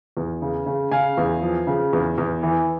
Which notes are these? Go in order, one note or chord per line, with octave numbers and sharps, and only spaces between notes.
E2
C#3
C#3
C#3 F5 G#5
E2
F3
C#3
E2
E2
E3